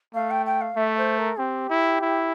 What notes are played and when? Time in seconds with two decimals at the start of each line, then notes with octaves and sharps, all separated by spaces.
0.14 A3 F5
0.30 G5
0.46 G5
0.61 F5
0.76 A3 E5
0.97 C5
1.18 A#4
1.39 C4 G4
1.70 E4
2.01 E4